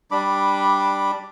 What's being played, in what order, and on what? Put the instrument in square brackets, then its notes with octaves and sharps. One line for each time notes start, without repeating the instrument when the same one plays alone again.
[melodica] G3 D4 B5 D6